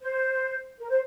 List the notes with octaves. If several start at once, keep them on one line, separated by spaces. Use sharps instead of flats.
C5
A#4
C5